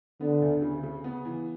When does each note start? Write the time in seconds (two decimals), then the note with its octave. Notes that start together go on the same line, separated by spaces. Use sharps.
0.21 D3 B3
0.42 D2
0.62 C#3
0.83 C#3
1.04 B3
1.25 E3